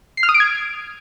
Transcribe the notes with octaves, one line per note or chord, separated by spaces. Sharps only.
C7
F6
D#6
D7
G#6